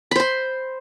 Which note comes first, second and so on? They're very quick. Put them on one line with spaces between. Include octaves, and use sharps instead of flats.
B5 C5 C6